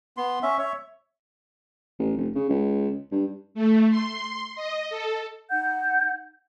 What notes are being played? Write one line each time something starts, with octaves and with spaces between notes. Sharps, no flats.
B3 C6
C#4 E5
C#5 E5
A1
F1
C#3
C#2
G2
A3
C6
D#5
A4
D#4 F#5 G6